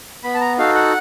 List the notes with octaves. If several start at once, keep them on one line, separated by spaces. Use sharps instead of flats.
B3 B5
A5
A#5
D#4 F#4 A4 F5
F#5